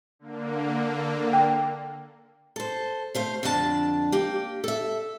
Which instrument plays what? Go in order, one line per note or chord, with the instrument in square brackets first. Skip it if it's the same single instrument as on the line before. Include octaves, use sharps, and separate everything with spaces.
[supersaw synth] D3 A#3
[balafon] G5
[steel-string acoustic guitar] A4 C5
A3 C5 F5
F2 D3 D4 E4 A5
A#3 G4
A4 E5